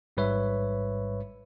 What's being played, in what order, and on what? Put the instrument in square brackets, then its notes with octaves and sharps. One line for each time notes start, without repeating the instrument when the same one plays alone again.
[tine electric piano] A1 G#2 G3 B4 C#5 E5